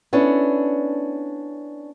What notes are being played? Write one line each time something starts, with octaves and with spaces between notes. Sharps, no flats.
B3 C#4 D4 E4 A4